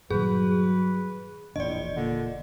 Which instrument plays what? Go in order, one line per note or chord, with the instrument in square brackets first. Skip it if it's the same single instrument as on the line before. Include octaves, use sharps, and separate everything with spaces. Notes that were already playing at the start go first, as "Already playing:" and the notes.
[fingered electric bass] G2 A#2 D#3 [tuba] F#3 [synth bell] G#4 [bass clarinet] B4
[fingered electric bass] E1 D4 [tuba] A#1 [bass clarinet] A2 [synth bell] D5 D#5
[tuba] A#2 [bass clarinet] D3